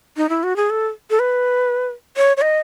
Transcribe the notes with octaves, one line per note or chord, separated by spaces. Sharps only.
D#4
E4
F#4
G#4
A4
A4
B4
C#5
C#5
D#5